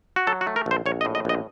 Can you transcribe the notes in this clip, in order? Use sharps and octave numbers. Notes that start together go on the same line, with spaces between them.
F#4
F#3 A4
F#4
A3
A#4
A#1 C5
A#1 C#5
D#5
A2
D#5
A#1 D#5